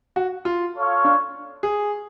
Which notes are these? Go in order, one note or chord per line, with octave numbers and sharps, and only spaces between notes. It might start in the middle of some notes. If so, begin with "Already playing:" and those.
F#4
F4
F4 A4 C#5 F5
D4
G#4